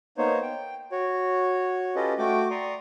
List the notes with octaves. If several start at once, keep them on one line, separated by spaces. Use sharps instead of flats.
A#3 B3 D#4 C5 C#5
G5
F#4 C#5
C#4 F4 G4 A4 B4 D#5
A3 F#4 G5 D6
D5 A#5 C6 C#6 D#6